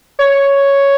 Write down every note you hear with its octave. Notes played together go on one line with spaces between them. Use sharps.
C#5